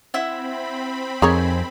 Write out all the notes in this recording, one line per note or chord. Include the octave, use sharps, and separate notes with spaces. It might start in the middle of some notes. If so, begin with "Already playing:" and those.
C4 E4 E5 F#5 B5
F2 D#4 G#4 A#4 C#5 G#5